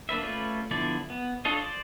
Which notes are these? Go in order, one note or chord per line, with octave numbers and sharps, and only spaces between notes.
A#3 D4 B4 E5
A3 C#4 F4 B4 D5
D3 F3 B3 E4 D5
B3
D4 F4 A4 C#5 D#5
C5 D5